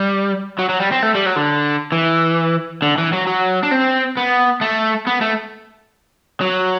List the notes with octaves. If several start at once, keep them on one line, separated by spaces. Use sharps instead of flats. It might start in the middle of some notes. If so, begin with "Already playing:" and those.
Already playing: G3
F#3
F#3
G3
C4
A3
G3
F#3
D3
E3
D3
E3
F#3
F#3
D4
C4
B3
A3
B3
A3
F#3